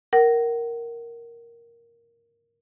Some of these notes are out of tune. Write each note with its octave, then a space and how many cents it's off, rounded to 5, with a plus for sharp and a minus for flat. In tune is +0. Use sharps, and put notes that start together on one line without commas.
A#4 +0 F#5 +35